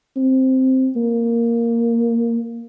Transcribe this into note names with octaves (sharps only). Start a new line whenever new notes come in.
C4
A#3